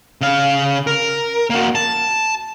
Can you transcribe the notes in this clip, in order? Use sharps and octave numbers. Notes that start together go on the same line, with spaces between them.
C#3 F5
A#4
A#3 F#4
A5